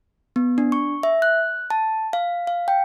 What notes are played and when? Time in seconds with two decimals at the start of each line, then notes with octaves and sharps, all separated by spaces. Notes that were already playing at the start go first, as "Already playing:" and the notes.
0.36 B3
0.58 D4
0.72 C#6
1.03 E5
1.22 F#6
1.70 A5
2.13 F5
2.47 F5
2.68 G5